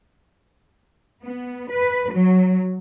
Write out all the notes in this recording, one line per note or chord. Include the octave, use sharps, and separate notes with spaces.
B3
B4
F#3